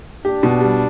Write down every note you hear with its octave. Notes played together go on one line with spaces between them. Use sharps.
D4 G4
B2
G3